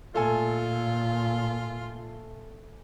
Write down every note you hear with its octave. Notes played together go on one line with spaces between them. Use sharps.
A#2 A3 F4 A4 G#5